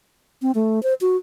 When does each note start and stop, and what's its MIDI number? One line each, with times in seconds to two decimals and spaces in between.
0.42 0.51 60
0.55 0.82 57
0.83 0.94 72
1.01 1.16 66